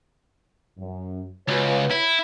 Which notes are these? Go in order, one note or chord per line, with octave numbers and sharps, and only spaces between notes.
F#2
C#2 F#4 B4 C#5
E4